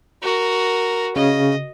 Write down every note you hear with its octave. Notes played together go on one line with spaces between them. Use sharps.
F#4 A#4
C#3 D#5